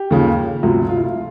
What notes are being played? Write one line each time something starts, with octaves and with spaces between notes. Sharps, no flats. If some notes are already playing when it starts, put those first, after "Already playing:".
Already playing: G4
D#2 C#3 F3
D2 C3 F3 F#4
F4
E4
F4
F3